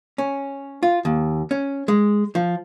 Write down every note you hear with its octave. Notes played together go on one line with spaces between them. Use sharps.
C#4
F4
D#2
C#4
G#3
F3